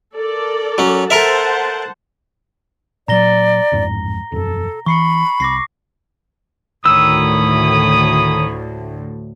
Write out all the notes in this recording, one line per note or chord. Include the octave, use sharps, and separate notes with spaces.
A4 A#4 D5
F#3 C#4
A4 A#4 C5 E5 F#5 A5
A#2 F#3 D5 A#5 A#6 G7
A1 F2 G#2
E1 F#2 A4
E3 B5 C#6 C7 C#7
C2 D6 A#6 C7
D2 A2 D#3 C#5 B5 D#6 E6